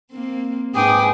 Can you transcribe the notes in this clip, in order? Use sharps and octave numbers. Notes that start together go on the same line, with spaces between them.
A#3 C4
G#2 G#4 B4 G5 G#5 D6 D#6